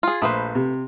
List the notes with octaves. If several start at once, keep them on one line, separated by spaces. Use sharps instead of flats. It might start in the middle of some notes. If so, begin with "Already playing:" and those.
F4 G#4
A#1 A3 B4 C5 D#6
C3